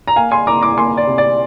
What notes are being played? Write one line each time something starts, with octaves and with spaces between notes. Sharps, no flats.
A#5
A#3 F5 G#5
G#5 C6
A#3 A#5 D6
A#5 D6
A#3 G#5 C6
D5
C3
D5